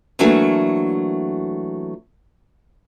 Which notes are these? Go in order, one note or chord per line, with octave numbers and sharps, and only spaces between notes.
E3 F#3 A3 A#3 D4 F#4